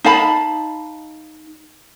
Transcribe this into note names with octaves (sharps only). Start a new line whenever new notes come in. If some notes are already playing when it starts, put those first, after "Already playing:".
D#4 F5 A5 B5